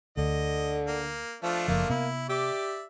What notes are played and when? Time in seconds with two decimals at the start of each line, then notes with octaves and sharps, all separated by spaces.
0.17 D2 D3 D#5
0.88 A#3
1.43 F3 A3 D4 F4
1.68 F#1 F3 A#3
1.90 C3 B3 E4
2.29 G4 D5 E5